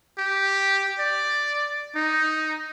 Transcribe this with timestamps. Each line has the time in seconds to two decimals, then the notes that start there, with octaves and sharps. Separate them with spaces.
0.18 G4
0.99 D5
1.96 D#4